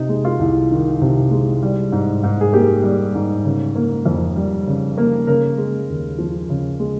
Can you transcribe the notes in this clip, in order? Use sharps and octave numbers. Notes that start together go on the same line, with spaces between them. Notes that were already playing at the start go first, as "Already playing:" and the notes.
Already playing: C3 D#4
G#3
F4
C2
D#3
C3
G#3
G3
G#2
G#2
G#4
A#3 G4
G3
G#2
C#3
A#3
F2
G3
C#3
A#3
C#3 A#4
G#3
D#2
F3
C#3
G#3